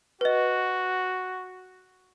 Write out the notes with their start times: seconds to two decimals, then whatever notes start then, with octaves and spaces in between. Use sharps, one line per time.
0.21 F#4 B4 D#5